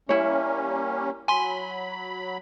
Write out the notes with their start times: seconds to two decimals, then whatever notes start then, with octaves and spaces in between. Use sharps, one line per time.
0.09 G3 A#3 C#4 E4 C#5
1.28 F#3 G#5 B5 C6